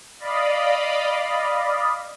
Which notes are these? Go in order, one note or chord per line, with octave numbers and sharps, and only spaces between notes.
D5 D#5 F5 B5